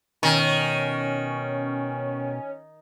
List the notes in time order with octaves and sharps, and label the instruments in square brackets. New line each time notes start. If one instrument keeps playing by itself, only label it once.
[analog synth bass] B2 [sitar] D#3 [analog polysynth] C#4